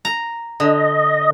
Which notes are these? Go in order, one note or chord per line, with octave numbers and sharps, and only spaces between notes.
A#5
D3 D#5